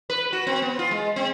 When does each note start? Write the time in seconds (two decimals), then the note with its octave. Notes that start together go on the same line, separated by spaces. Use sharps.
0.10 B4
0.33 F#4
0.47 C4
0.62 B3
0.79 F4
0.91 G#3
1.16 C4